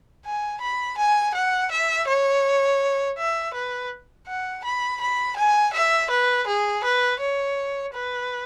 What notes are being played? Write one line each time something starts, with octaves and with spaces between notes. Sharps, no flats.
G#5
B5
G#5
F#5
E5
C#5
E5
B4
F#5
B5
B5
G#5
E5
B4
G#4
B4
C#5
B4